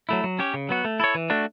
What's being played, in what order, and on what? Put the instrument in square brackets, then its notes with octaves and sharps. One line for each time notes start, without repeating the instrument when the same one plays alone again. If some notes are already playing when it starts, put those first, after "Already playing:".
[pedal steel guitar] F#3 A3 E4
F#3
C#4 G4 C#5
C#3
F#3 B3 F#4
A3
E4 A4 C#5
E3
A3 D4 F#4